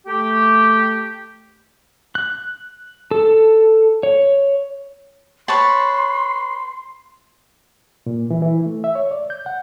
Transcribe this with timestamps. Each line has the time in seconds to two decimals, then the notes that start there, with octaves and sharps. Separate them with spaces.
0.07 A3 G4
2.15 F#6
3.11 A4
4.03 C#5
5.48 B4 C#5 A5 C6
8.06 A#2
8.31 E3
8.42 E3
8.66 A3
8.84 E5
8.95 C#5
9.11 D5
9.30 G6
9.46 F#5